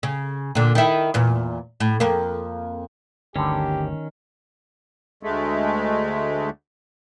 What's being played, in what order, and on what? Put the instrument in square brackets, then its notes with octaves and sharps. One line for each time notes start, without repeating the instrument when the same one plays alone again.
[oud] C#3
A#2 D3
D#3 E4
E2 A#2
A2
F2 A#3
[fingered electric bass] G1 D2 [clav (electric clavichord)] D3 G3 [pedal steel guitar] D#3 C#4 [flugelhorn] G4
[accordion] D2 G#3 A3